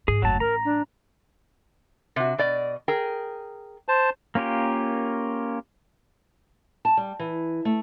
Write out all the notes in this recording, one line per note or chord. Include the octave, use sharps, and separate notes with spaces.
G#2 G#4
F#1 D2 F#3 A5
A1 A#4 A#5
D4
C3 F#4
B2 D5 D#5
G#4 A#4 G5
C5 A5
A#3 C#4 F4 G4 A#4
A5
G3
E3
A3